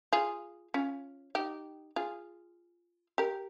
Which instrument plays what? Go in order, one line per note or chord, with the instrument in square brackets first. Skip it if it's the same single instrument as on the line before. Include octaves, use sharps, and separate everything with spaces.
[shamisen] F4 G#4
C#4 F4
D#4 G4
F4 G#4
G4 A#4